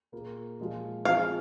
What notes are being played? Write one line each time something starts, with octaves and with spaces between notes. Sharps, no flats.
A#2 A#3 G#4
A#2 F3 G#3 F4
F3 C4 F4 G#4 F5